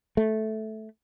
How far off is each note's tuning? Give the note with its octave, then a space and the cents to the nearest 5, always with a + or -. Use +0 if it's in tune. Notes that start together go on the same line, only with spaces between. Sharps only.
A3 -10